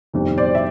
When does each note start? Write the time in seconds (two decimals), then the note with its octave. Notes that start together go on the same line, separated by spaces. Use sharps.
0.14 G1 F2 C3 D#3
0.38 C5 D5
0.55 E5